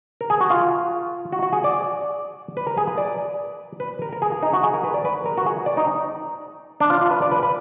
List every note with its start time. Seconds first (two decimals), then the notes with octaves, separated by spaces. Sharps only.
0.21 A#4
0.30 G#4
0.41 F#4
0.50 F4
1.32 F#4
1.43 F#4
1.53 G#4
1.64 D5
2.57 B4
2.67 A#4
2.77 G#4
2.87 B4
2.98 D5
3.80 B4
4.02 A#4
4.13 A#4
4.22 G#4
4.43 D#4
4.53 F#4
4.64 G#4
4.74 A#4
4.84 B4
4.94 D5
5.05 B4
5.26 A#4
5.38 F#4
5.46 G#4
5.66 D5
5.77 D#4
6.80 D4
6.90 F4
7.01 F4
7.10 B4
7.22 D5
7.31 B4
7.43 B4